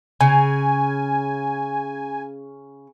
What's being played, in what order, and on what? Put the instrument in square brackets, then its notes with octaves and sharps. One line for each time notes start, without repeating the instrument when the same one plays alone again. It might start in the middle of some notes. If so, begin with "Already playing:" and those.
[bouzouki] C#3 [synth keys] G#5